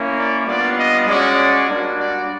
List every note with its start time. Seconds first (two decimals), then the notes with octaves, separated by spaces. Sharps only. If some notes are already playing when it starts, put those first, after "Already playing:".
Already playing: A#3 C#4 E4
0.17 D5
0.47 G3 B3 D4 F4 D5
0.78 D#5
1.07 G#3 C#4 F#4 D5
1.68 G3 A#3 D4 F#4
1.98 D5